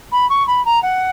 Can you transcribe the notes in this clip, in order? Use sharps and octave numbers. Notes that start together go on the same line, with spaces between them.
B5
C#6
B5
A#5
F#5